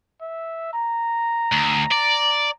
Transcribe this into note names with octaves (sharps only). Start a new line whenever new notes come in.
E5
A#5
D2
D5